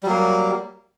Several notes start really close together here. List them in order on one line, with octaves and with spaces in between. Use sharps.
G3 F#3 A#3